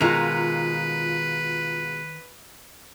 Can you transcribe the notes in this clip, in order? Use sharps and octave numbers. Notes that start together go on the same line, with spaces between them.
B2 D#3 G#3 F4 A#4 B4 A#5 F7